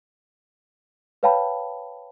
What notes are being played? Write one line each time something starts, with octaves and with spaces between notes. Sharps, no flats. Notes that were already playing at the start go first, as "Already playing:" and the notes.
B4 C#5 F5 G5 A5 B5